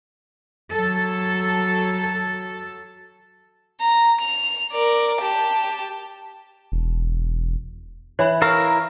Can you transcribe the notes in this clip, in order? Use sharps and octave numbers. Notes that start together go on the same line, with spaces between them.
F#3 A4
A#5
F7
A#4 D5
G4 A5
E1
E3 C#5 B5
E4 A#4 F5 C#6 F6